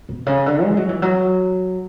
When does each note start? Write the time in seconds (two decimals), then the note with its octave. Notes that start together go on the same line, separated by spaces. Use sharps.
0.09 B2
0.26 C#3
0.46 D3
0.63 G#3
0.77 F#3
0.89 E3
1.02 F#3